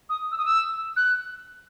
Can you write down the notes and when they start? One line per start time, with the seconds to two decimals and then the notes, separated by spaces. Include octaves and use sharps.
0.09 D#6
0.32 E6
0.38 D#6
0.45 E6
0.96 F#6